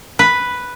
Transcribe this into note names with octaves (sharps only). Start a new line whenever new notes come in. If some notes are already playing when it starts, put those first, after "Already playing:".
B4